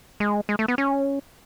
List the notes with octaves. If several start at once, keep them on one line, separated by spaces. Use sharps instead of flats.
G#3
G#3
A3
B3
C#4